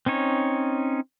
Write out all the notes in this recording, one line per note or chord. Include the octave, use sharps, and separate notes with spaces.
C4 C#4 D#4 C#5